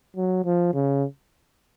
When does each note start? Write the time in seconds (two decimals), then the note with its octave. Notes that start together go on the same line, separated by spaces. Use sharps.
0.17 F#3
0.45 F3
0.74 C#3